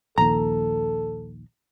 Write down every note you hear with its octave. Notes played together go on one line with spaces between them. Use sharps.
A#1 D#2 A4 A#5